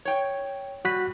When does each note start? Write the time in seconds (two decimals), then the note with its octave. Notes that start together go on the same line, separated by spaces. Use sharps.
0.05 C#5 G5
0.85 G3 F#4 F#6 B6